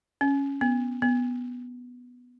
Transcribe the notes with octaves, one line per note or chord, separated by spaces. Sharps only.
C#4
B3
B3